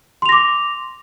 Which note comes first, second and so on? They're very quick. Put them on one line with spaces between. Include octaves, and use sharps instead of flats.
C6 F7 A#6 D6